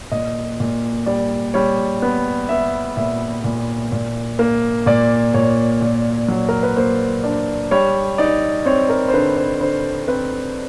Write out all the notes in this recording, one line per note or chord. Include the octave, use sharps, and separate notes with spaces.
A#2 D#5
A#2
G3 D5
G3 C#5
B3
B3 E5
A#2 E5
A#2
A#2
A#3
A#2 D5
A#2 C#5
A#2
F#3
A#4
B4
A#3 C5
D4 D5
G3 C#5
D#4 D5
C4 C#5
A#4
C5
D3 B4
C5
D3 C5
C4 B4